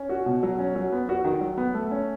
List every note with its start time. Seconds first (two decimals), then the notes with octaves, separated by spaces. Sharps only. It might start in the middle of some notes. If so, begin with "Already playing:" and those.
Already playing: C#4
0.09 F#4
0.26 B2
0.43 F#3
0.59 C#4
0.76 F#3
0.92 B3
1.09 F#4
1.25 D#3
1.41 F#3
1.58 B3
1.74 A3
1.91 C#4